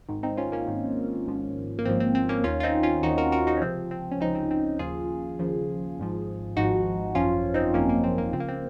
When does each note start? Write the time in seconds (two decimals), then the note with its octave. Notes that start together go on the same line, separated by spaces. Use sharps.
0.08 G#1 G#2 D#3
0.23 C4 D#4
0.37 C#4 F4
0.52 A#3 C#4
0.67 G#1 G#2 D#3
1.27 G#1 G#2 F3
1.79 A#3
1.85 G#1 G#2 F3 C4
2.00 C4
2.15 C4
2.29 A#3 C#4
2.44 D#2 D#3 C#4 F4
2.60 F4
2.63 C4 D#4
2.83 C#4 F4
3.03 D#2 D#3 D#4 F#4
3.18 F#4 A#4
3.32 F#4 A#4
3.47 D#4 F#4
3.57 C#4
3.61 C#2 C3 F3 C4
3.91 C4
4.12 C#4
4.21 C#2 C3 F3 C4 D#4
4.35 C4
4.51 C4
4.79 D#2 C#3 F3 F4 G#4
5.39 D#2 C#3 F3
5.98 G#1 G#2 F3
6.56 G#1 G#2 F3 D#4 F#4
7.15 G#1 F#2 F3 C#4 F4
7.54 C4 D#4
7.74 G#1 F#2 F3 A#3 C#4
7.89 A#3
8.04 C4
8.18 A#3
8.33 C#2 C#3 F3 C4
8.40 A#3
8.48 C4